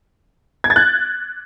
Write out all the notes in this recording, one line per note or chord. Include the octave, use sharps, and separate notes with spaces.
G#6
A6
F#6